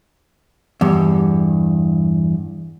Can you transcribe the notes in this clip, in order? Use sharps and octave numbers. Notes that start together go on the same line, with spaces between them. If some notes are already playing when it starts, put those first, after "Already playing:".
E2 G2